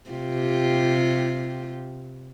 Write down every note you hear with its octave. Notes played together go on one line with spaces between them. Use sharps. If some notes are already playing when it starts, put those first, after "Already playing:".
C3 F4 G4